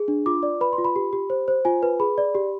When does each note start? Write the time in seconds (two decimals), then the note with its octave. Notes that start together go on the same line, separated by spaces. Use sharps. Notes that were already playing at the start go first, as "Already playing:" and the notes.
Already playing: G#4
0.08 D4
0.26 F4 D6
0.43 D5
0.61 B4 B5
0.73 C6
0.78 F4
0.85 B5
0.96 G4
1.13 G4
1.30 C5
1.48 C5
1.65 F4 G#5
1.83 B4
2.00 G#4 B5
2.18 D5
2.35 G4